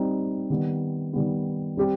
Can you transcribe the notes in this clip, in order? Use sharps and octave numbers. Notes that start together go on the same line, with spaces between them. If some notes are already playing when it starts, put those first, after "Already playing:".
Already playing: G3 C4 D#4
D#3 G3 B3
D#3 G3 B3
G3 C4 G4